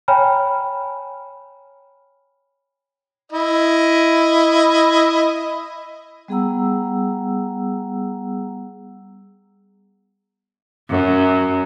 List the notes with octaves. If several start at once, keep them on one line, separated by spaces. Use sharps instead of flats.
C#5 G5 G#5 A#5 B5 F6
E4 D#5
G3 B3 G#4 F#5 A#5 E6
F#2